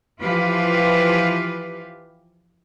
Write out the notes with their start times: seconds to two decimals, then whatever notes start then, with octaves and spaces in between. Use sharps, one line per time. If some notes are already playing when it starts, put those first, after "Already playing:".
0.21 E3 F3 F4 G4 B4